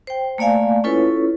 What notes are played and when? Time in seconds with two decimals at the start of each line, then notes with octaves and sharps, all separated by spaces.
0.07 C5 G5
0.38 A3 A#3 D5 F5 G#5
0.84 C#4 E4 F4 A4 B4 C#5